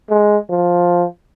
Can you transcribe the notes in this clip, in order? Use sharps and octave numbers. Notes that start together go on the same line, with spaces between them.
G#3
F3